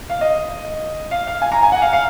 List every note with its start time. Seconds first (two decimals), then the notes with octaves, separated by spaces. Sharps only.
0.09 F5
0.21 D#5
1.11 F5
1.27 F5
1.42 G#5
1.52 A#5
1.63 G#5
1.72 F#5
1.82 F5
1.93 F5